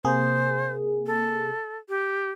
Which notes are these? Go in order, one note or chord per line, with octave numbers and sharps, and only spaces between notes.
C3 A#3 G#4 C5
A4
G4